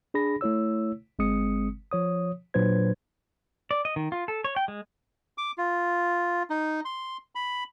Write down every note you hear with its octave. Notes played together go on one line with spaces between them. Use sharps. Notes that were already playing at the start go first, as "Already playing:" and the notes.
D4 G#4 B5 A#6
A3 E4 C#5 E6
G1 G#3 C4 D#6 C#7
F3 C#5 D#6
A#2 F#3 D4 B4 C5 G#6
D5
D#5
D#3
F4
A4
C#5
G5
G#3
D6
F4
D#4
C6
B5